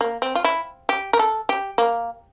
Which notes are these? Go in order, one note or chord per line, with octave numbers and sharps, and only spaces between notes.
A#3
C4
F4
E4
G4
A#4
A4
G4
A#3